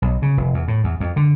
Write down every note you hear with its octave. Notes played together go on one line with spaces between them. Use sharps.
B1
C#3
F1
E2
A2
E2
F2
D3